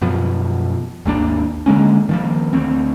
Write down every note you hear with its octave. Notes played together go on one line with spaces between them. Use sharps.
F#2 B2 F3
G#1 D#2 A#3 D4
D3 G#3 A#3 C#4
D#3 F3 A#3
D2 C4